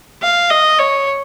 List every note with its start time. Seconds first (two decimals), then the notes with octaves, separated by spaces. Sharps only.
0.22 F5
0.50 D#5
0.79 C#5